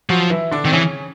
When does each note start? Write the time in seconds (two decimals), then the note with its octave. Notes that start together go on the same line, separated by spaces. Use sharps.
0.09 F3 F#3 F#4
0.30 E3 E4
0.51 D3 D4
0.65 D#3 C4
0.72 C#3 E3 C#4